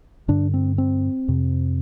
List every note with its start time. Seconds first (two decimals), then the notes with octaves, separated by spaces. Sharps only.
0.28 G2 D3 D4
0.54 C4
0.78 C4
1.28 F2 C3